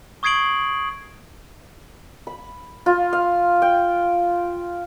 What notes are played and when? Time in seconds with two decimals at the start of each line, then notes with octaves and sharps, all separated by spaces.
0.23 C#6 D#6 G#6 C7 D7 F#7
2.27 B5
2.86 F4
3.13 F5
3.62 G5